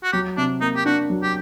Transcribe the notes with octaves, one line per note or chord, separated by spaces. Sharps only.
F#4
F#3 G4
C3 D4
A#3 D#4
G4
D4 F#4
F#3
G4